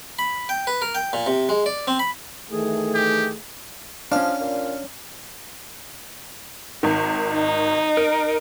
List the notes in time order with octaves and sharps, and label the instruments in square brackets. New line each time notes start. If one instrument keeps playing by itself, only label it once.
[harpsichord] B5
G5
B4
A#4
G5
A#2
C3
G#3
D5
C4
B5
[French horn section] D#3 E3 A3 [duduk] G#4
[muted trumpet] G4
[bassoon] F3 [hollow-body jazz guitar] C#4 D4 [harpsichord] F5
[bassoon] A#2
[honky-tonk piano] G#1 D#3
[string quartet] D#4
[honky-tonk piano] A#4